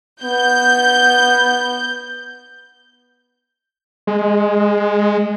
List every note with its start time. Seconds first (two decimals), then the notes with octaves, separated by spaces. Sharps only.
0.24 B3 G6
4.07 G#3